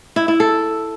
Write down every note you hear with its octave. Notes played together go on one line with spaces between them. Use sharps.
E4
E4
A4